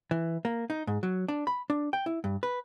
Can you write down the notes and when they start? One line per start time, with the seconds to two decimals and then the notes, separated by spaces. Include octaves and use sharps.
0.11 E3
0.45 A#3
0.70 D#4
0.87 G#2
1.03 F#3
1.28 D4
1.47 B5
1.70 D4
1.93 G5
2.06 E4
2.24 G2
2.43 B4